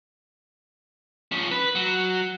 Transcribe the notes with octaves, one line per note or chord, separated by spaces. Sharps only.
F3 C#4
B4
F#3